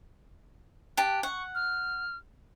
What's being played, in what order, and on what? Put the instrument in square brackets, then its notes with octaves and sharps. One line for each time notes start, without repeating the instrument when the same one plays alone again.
[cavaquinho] G4 A5 [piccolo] F#6
[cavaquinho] F#5 [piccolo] C#6
[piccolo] F6